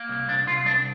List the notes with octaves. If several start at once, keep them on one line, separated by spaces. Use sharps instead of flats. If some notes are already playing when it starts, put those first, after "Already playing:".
Already playing: A#3
C2
C2 D4
C2 F4
C2 D4